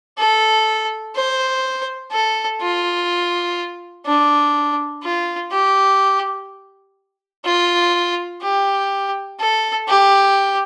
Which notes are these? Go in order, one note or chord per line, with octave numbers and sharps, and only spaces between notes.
A4
C5
A4
F4
D4
F4
G4
F4
G4
A4
G4